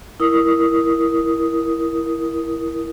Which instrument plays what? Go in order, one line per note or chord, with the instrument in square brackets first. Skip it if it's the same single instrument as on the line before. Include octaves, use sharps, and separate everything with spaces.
[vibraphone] E4 A#4 D#6